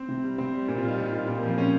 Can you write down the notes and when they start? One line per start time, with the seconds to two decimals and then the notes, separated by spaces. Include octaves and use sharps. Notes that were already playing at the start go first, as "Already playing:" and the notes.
Already playing: C4
0.08 C3
0.23 G3
0.38 C3 C4
0.53 G3
0.68 A#2 C4
0.78 F4
0.83 G3 D#4
0.98 A#2 D#4
1.05 F4
1.13 G3 D#4
1.27 A#2 C4
1.37 A#3
1.43 F3 C4
1.58 G#3 C#4